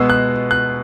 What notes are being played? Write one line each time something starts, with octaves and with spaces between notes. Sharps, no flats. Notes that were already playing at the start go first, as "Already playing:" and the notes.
Already playing: B2 G#3 B3 E6
F#6
F#6